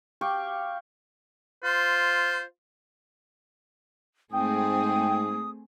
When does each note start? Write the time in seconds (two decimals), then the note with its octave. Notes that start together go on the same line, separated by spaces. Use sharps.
0.21 G4 F5 G5 C#6
1.63 F4 C5
4.33 G#2 A3 C4 G#4 G5 D#6